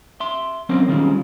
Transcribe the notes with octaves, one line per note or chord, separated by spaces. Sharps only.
E5 C6
F#3 C4 C#4 A#4 C5
D#3 G3 G#3 C4 C#4 F4